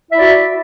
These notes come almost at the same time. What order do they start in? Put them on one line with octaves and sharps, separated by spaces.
E4 E5 D5 F#4